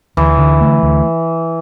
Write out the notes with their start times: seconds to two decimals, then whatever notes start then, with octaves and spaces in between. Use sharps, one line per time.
0.17 D2 E3
0.38 D3
0.61 A3
0.83 D2